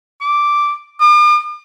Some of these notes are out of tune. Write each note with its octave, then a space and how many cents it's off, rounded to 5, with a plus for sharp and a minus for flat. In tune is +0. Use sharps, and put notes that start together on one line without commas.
D6 -5
D6 +45